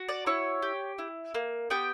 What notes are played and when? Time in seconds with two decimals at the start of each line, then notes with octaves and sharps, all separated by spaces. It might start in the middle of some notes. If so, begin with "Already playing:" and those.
Already playing: F#4
0.08 D5 D6
0.26 E4 C#5 C#6
0.62 G4
0.98 E4
1.34 A#3
1.70 B3 G4 G5